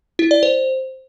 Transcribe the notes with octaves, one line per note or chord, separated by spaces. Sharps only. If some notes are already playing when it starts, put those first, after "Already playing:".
E4
D5
C5